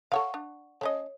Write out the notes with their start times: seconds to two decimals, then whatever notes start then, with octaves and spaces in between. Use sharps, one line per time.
0.12 A4 C#5 F5 F#5 C#6
0.34 D4
0.81 A3 C#4 C#5 D#5